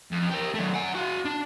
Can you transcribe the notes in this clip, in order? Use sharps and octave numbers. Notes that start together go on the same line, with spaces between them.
F2
G4 A#4
F#3 A3
F#5 G#5
F#4 F5
D4